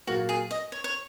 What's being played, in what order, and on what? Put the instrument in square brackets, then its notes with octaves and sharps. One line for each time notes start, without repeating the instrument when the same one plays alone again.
[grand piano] A#2 F#3 A#3 [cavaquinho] F#4
[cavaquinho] G#4
D#5
C#5
C#5